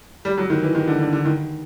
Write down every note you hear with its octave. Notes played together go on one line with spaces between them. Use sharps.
G3
F#3
D#3
E3
D#3
D3
D3
D3
D#3